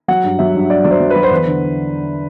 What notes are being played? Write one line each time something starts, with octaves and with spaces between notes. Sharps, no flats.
F#3 F#5
G2
F#3 E5
G2
G2 D5
F#3 D5
C5
F#3
B4
F#3
C5
E2 B4
D3